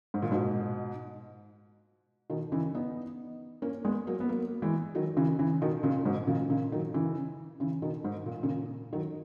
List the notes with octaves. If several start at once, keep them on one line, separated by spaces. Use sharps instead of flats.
G#2
A#2
G#2 B2
B2 D#3
C#3 E3
B3 D#4
A#3 C#4
G#3 B3
F#3 A#3
B3
F#3 A#3
E3 G#3
D#3 F#3
C#3 E3
C#3 E3
B2 D#3
A#2 C#3
G#2 B2
A#2 C#3
A#2 C#3
D#3 F#3
C#3 E3
C#3 E3
B2 D#3
G#2
A#2
A#2 C#3
D#3 F#3